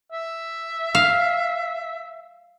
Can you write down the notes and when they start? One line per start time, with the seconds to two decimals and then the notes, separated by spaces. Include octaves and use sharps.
0.12 E5
0.95 F5